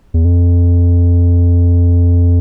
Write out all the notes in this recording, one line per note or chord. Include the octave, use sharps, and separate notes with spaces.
E2
F2